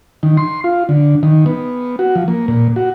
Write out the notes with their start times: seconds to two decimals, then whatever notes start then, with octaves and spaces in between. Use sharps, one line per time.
0.23 D#3
0.37 C6
0.64 F4
0.89 D3
1.23 D#3
1.46 B3
1.99 F#4
2.16 F3
2.28 A#3
2.48 A#2
2.76 F#4